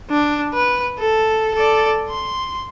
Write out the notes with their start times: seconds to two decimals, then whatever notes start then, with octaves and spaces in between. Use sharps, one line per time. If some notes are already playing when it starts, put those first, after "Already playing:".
0.10 D4
0.54 B4
0.99 A4
1.55 A4 D5
2.09 C6